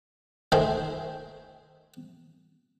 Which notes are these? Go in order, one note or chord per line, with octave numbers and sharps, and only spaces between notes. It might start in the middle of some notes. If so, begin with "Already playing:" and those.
D#3 A3 G#4 C5 B5 C6